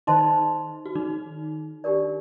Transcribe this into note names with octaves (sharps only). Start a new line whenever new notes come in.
D#3 D#4 C5 D#5 A5 C6
F#4
D#3 D#4
D4 G4 A#4 D5